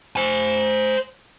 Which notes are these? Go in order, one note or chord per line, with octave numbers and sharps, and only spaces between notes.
C5 G#5